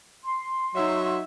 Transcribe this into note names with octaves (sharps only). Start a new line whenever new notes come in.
C6
F#3 D#4 E5